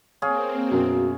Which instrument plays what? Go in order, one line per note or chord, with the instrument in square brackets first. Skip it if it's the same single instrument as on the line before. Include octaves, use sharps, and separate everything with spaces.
[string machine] A#3 C4 [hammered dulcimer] G#4 C#5 F5
[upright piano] F#2 B2 A#4 [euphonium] F#4